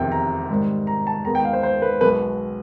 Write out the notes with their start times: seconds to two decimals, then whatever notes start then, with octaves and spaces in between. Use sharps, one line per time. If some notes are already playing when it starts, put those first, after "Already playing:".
Already playing: F1 E2 C3 D#3 G5
0.12 A#5
0.49 G#2 D#3 G3
0.87 A#5
1.07 A5
1.25 D#2 D#3 G#3 B3 A#5
1.35 G5
1.45 F5
1.53 C5
1.63 C5
1.82 B4
2.01 B1 B2 G#3 B4